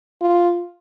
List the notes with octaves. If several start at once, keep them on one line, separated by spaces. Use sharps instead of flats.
F4